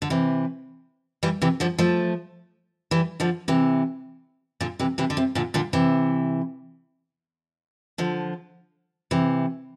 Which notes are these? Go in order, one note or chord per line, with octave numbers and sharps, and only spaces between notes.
D3
C3 E3
E3 G3
C3 E3
D3 F3
F3 A3
E3 G3
D3 F3
C3 E3
A#2 D3
C3 E3
C3 E3
D3
C3
A#2 D3
A#2 D3
C3 E3
D3 F3
C3 E3